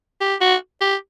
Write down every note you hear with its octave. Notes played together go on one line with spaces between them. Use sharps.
G4
F#4
G4